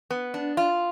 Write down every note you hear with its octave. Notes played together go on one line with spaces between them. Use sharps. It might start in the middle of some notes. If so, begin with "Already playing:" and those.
B3
D4
F4